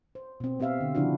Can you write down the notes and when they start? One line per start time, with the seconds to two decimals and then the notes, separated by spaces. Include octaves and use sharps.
0.15 C5
0.40 B2 C4
0.60 B3 C4 G4 E5 F5
0.81 D3
0.95 C#3 F3 D4 E4 F#4